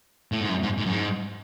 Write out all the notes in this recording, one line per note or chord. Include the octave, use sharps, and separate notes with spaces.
A2
G#2
F#2
G#2
G#2
F#2
G#2